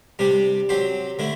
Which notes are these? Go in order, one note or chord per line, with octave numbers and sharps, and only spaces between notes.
C3 G3 D4 G4
F#3 C4 G4 C5
D3 A3 E4